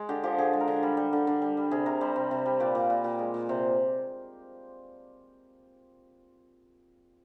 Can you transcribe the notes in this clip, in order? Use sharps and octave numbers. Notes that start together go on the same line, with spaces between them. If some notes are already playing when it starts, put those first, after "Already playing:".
Already playing: G#3
D3 G4
F3 G4
D3 G#4
G#3
A#4
D3
G3
G3
D3
D3
G3
G3
C3 G#4
C3 A#4
G3 C5
C3
C3
G3
A#2 D5
A#2
A#2
A#2
G#3
A#2
C3 C5